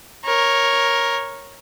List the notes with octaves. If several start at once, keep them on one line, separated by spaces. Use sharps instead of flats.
A#4 C#5